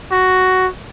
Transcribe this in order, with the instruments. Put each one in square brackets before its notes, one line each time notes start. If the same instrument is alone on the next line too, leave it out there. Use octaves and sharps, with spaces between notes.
[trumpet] F#4